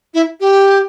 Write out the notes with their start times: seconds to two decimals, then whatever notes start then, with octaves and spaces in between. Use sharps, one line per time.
0.14 E4
0.40 G4